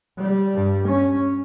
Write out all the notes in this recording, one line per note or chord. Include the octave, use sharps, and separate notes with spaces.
G3
G2
C#4